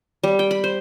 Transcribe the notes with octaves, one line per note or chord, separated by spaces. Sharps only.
G3
G5
B5
C5